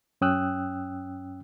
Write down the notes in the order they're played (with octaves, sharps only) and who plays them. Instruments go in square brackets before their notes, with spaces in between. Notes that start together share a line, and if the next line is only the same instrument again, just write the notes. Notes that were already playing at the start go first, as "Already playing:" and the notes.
[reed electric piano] F#2 C#4 G5 D#6 E6 F#6